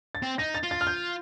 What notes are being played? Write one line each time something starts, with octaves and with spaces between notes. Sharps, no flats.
A6
C4
D#4 A#6
A6
F4
A6
F6
G6